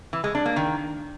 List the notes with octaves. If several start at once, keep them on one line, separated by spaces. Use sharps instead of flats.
E3
G#3
D4
A#3
D#3